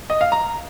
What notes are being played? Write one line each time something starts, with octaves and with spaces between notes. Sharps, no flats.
D#5
F5
A#5